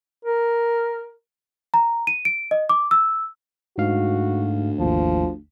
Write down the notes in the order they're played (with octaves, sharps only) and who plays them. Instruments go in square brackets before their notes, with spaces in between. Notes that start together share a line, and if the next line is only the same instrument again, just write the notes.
[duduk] A#4
[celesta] A#5
D#7
D7
D#5
D6
E6
[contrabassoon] D2 [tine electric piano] G#2 F5 [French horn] F#4
[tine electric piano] G#1 D#2 [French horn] F3